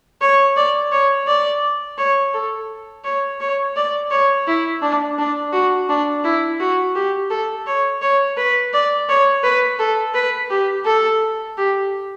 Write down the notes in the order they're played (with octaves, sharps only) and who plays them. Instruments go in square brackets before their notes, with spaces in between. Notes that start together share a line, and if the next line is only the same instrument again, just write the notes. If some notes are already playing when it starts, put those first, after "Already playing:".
[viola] C#5
D5
C#5
D5
C#5
A4
C#5
C#5
D5
C#5
E4
D4
D4
F#4
D4
E4
F#4
G4
A4
C#5
C#5
B4
D5
C#5
B4
A4
B4
G4
A4
G4